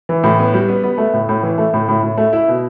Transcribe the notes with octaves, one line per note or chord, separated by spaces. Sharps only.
E3
A2
B3
G3
B3
B3
A3
A2
A2
E3
A3
A2
A2
A2
A3
E4
B2